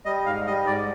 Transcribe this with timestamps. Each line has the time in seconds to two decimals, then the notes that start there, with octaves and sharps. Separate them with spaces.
0.05 G3 D#5
0.26 G#2 F5
0.47 G3 D#5
0.66 G#2 D5